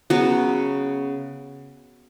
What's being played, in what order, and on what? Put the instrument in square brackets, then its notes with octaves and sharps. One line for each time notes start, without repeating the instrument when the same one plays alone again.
[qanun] C#3 F#3 B3 F#4